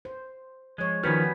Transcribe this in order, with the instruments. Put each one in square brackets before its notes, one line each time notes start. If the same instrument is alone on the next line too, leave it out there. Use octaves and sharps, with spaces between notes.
[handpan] C5
[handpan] F3 C#5 [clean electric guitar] G#3
[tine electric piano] D#3 F3 F6 [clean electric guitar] G3 B3 C#4 [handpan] F#4 B4